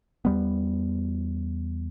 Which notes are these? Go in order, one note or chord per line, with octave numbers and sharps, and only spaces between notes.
E2 G3 B3